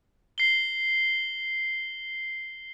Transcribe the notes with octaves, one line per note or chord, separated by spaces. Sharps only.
C7 G7